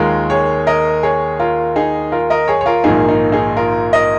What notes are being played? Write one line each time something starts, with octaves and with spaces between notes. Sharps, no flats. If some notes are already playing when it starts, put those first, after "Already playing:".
Already playing: D#2 D#3 G#3 F4 A#4
G#4 C#5
A#4 D#5
G#4 C#5
F4 A#4
D#4 G#4
F4 A#4
A#4 D#5
G#4 C#5
C#5
F4 A#4
A#1 G#2 D#3 A#3 D#4 G#4
D#4
D#4 G#4
F4 A#4
A#4 D#5